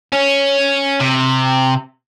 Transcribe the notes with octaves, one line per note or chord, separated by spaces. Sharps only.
C#4
C3